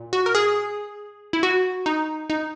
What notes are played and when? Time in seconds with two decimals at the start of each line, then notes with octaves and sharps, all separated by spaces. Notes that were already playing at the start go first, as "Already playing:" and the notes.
Already playing: A#2
0.13 F#4
0.26 A#4
0.35 G#4
1.33 E4
1.43 F#4
1.86 D#4
2.30 D#4